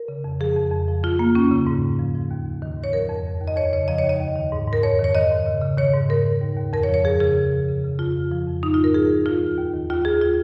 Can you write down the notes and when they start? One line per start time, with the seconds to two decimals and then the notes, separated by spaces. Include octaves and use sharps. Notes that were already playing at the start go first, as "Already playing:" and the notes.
Already playing: A#4
0.08 C#3
0.24 F2
0.40 F3 G#4
0.56 F2
0.72 F2
0.88 F3
1.03 F2 F4
1.19 F2 A#3
1.35 D#2 C#4
1.51 C#3
1.67 G#2
1.82 G#2
1.99 F3
2.15 F3
2.30 D#2
2.46 D#2
2.62 D#3
2.77 G#2
2.84 C#5
2.93 F3 A#4
3.09 F2
3.25 D#2
3.41 D#2
3.48 D#5
3.57 F2 C#5
3.72 C#3 C#5
3.88 F3 D#5
3.98 C#5
4.04 D#2
4.09 D#5
4.20 D#2
4.36 D#3
4.52 G#2
4.67 G#2
4.73 A#4
4.83 F2 C#5
4.99 D#3
5.04 C#5
5.15 D#3 D#5
5.31 G#2
5.46 C#3
5.62 C#3
5.78 D#3 C#5
5.94 G#2
6.09 G#2 A#4
6.25 G#2
6.41 D#2
6.57 D#2
6.73 F2 A#4
6.83 C#5
6.89 F3
6.94 C#5
7.04 F3 G#4
7.20 C#3 G#4
7.37 C#3
7.53 F3
7.68 C#3
7.84 C#3
7.99 F2 F4
8.16 F3
8.32 F3
8.46 F2
8.63 G#2 D#4
8.74 G#2 F4
8.84 A#4
8.94 F3 G#4
9.10 D#2
9.26 F3 F4
9.41 D#2
9.57 D#2
9.74 D#3
9.89 D#2 F4
10.05 D#2 G#4
10.22 F4